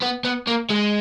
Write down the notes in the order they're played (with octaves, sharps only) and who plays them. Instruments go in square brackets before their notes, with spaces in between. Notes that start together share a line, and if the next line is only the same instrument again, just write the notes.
[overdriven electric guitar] B3
B3
A#3
G#3